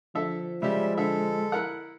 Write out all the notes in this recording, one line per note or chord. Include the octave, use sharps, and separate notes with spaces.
D3 F3 A4 E5
C#3 G3 G#3 G4 E5
D3 A4 E5
E4 A#4 F#5